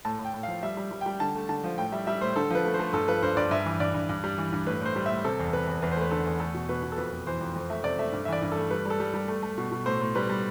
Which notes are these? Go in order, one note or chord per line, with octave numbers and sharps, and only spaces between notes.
A2 A5
A2
G5
A2
F3 F5
G3 E5
G3
G3
G5
G3
D3 A5
A3
D3 A5
F3
A2 G5
G3 E5
G3 E5
A2 C5
D3 A4
F3 B4
A3
C5
A3
G2 A4
F3 B4
G2 C5
G2 D5
G2 E5
E3
G2 D5
G2
G2
G3
E3
G2
A2 B4
A2 C5
G3
A2 E5
C3 A4
E2
C3 B4
E2
E2 B4
C5
A3 B4
D3 A4
E2
A3 A4
B2
B2 B4
B2
A4
F2 B4
F2
E3 C5
F2
F2
A3 E5
C3 D5
A3 E5
G2
E5
E3 D5
G2
A3 A4
G3 B4
G3
A4
G3
G3
A3
A3
B2
B2
A2 C5
A2
G3 B4
G3